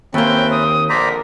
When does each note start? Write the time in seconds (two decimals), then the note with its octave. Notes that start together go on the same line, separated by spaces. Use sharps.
0.14 D#2 A#3 C4 C#4 B4 E5 G5
0.51 D#6
0.89 A#1 D3 A#4 C5 D5 A#5 B6